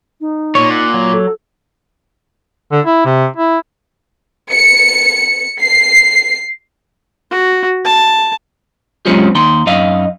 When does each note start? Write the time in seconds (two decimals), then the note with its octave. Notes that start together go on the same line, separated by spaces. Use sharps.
0.21 D#4
0.55 A#2 C#5
0.71 F#5
0.94 F#3
1.13 A4
2.72 D3
2.86 E4
3.05 C3
3.37 E4
4.53 C#7
5.62 C7
7.31 F#4
7.85 A5
9.06 F#3 G#3 C4 C#4 F4 G4
9.35 D#2 D#4 C6
9.66 F#2 D#4 D#5 F5